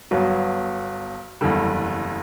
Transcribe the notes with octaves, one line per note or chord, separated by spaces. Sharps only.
G1 G2 F#3 B3
F#1 E2 D3 G3